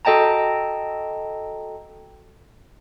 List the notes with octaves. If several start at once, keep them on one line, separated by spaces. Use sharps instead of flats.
F#4 A4 D#5 G5 A5 A#5